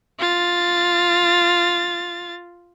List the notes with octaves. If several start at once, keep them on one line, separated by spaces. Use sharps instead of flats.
F4 A6